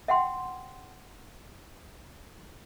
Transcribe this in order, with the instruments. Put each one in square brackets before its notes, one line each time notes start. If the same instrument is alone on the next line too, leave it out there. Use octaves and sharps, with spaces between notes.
[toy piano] E5 F#5 G5 C6